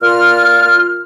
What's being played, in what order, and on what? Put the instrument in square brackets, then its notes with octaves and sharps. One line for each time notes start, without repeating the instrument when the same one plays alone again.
[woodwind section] A#2 F4 F6